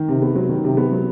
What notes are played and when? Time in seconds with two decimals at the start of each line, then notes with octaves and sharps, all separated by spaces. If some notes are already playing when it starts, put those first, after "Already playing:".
Already playing: D#3
0.08 C3
0.22 B3
0.35 F#3
0.49 D#3
0.64 C3
0.77 B3
0.92 F#3